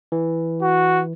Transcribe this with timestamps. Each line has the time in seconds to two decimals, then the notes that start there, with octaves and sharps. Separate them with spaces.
0.12 E3
0.62 F#4